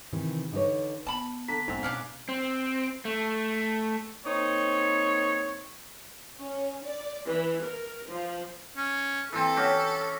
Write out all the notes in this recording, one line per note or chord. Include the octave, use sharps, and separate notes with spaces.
C3 D#3 E3
D3 D#4 F#4 B4 C#5
B3 A5 B5
D3 A#5 B6
B1 G#2 C4 E6
B2 C#4 D4 F5
C4
A3
A#3 C4 D#4 C#5
C#4
D5
E3
A#4
F3
C#4
E3 C4 A4
C#4 F#4 G4